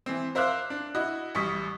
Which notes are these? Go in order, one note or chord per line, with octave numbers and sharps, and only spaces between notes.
E3 C4
A#4 C5 E5 F5 D6 F#6
D4
E4 F#4 D#5
A1 G3 C#6 D#6 B6